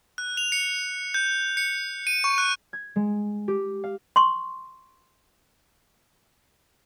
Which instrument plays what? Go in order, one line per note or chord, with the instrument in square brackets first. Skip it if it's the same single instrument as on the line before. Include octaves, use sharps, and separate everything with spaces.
[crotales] F#6
F7
C#7
G6
C#7
D#7
C#6
F#6
[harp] G#6
G#3
G4
F5
[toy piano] C6 C#6